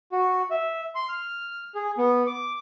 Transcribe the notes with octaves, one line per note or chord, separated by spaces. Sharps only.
F#4
E5
C6
F6
G#4
B3
D6